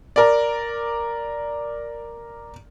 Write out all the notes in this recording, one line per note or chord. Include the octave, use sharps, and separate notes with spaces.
A#4 D5